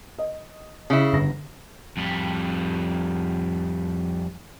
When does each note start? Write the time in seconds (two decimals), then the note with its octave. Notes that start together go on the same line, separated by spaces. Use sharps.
0.18 D#5
0.90 C#3 E4
1.12 G1 A#6
1.97 F2 G3